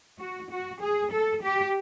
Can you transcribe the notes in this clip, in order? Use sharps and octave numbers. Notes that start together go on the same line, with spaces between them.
F#4
F#4
G#4
A4
G4